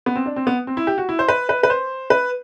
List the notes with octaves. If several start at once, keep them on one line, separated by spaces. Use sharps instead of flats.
B3
C4
D4
C4
B3
C4
E4
G4
F#4
E4
C5
B4
B4
B4
C5
B4